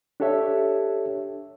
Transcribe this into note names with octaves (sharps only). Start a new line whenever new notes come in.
D4 G4 A4 C#5 E5